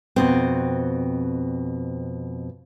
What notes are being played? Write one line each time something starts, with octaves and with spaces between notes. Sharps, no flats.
F2 B2 C4